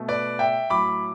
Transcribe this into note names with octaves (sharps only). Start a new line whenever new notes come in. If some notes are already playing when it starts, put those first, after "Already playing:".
Already playing: B2 A3
B4 D5
E5 G5
A2 F#3 A3 B5 D6